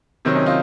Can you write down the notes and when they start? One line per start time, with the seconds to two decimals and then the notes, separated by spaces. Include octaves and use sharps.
0.25 C3 D#3 F#3 C4
0.35 C#4 D#4
0.46 D#4 F4